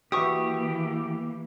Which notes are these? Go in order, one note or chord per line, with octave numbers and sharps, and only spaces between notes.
E3 A#3 F#4 G4 B4 E5 C#6 D#6